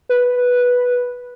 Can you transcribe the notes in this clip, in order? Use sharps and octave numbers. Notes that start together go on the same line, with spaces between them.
B4